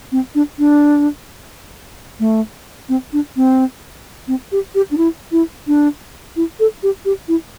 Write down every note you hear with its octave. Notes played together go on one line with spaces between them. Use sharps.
C4
D4
D4
A3
C4
D4
C4
C4
G4
G4
D4
E4
E4
D4
E4
A4
G4
G4
E4